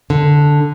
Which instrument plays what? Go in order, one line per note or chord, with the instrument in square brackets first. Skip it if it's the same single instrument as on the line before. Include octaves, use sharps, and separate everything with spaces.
[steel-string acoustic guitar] D3